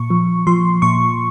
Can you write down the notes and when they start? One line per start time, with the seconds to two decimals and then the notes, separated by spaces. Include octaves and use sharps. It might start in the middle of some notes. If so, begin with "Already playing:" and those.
Already playing: A#2 C#6
0.10 F3
0.47 F3 C6
0.82 A#2 C#6